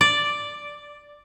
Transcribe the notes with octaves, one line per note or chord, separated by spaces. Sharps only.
D5